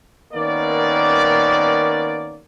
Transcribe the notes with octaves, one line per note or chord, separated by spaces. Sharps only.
D#3 A#3 B3 C#4 D5